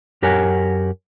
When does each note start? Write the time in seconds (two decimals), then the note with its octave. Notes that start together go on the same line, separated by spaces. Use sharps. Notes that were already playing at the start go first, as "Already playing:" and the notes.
0.22 F#2 G4 A#4 C#5 F#5 G#5